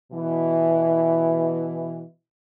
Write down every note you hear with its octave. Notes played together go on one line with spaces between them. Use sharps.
B2 E3